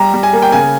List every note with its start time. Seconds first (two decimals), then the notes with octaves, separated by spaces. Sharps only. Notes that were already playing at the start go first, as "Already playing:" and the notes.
Already playing: G3 A#5
0.14 G3
0.23 G#5
0.33 A#3
0.42 G5
0.52 C#3 G#5